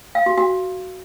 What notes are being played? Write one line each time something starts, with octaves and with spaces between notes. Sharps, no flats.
F5
F#4
F#4